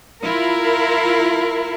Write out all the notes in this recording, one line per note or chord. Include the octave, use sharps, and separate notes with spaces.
E4 F4 A#4